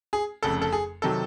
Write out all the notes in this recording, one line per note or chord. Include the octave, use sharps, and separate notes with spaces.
G#4
F1 F2 C#3 A4
A4
G#4
C3 D#3 F#3 A4